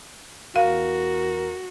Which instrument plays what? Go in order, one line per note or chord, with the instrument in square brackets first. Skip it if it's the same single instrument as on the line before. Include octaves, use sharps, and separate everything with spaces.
[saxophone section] E2 A#4 [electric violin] F#4 [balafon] F5